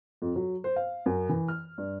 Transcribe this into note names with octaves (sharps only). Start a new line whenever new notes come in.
F2
F#3
C5
F5
F#2
E3
F6
G2